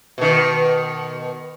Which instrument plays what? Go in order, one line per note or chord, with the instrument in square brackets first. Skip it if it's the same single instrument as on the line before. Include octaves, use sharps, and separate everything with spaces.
[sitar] B2 D#3